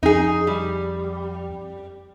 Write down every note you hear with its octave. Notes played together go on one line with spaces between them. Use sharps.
F2 D#4 G#4
G3